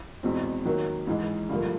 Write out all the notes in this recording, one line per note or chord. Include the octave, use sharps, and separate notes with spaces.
E2 B2 G#3 C4
D#3 F#3 A#3
G#2 E3 G#3
G2 D3 F3 A#3